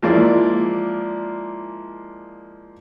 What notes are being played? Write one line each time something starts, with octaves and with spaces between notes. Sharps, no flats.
F3 G#3 A#3 E4 D5